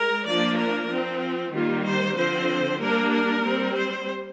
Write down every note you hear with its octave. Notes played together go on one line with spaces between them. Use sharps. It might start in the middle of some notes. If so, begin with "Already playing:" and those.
Already playing: G#3 A#4
F3 A#3 D4 D5
A#4
F3 C4
D#3 G3 A#3 F4
C5
D3 F3 C4 C5
G3 A#3 D4 A#4
A#4
G3 C4
C5